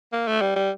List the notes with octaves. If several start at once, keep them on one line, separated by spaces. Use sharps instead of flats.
A#3
A3
G3
G3